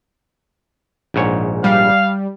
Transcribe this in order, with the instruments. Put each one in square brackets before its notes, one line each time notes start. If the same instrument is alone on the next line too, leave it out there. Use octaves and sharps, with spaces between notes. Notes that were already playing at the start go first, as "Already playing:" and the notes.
[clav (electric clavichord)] A#1 G#2 C#5
[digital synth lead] G3 [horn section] F5